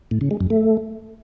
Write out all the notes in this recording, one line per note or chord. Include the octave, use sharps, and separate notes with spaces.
A2
C#3
G#3
F#2
A3